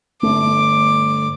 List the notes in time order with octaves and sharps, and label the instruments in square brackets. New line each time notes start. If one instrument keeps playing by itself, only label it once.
[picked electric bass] G1 A3 [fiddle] D6